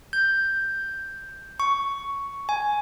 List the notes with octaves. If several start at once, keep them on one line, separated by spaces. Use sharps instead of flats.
G6
C#6
G#5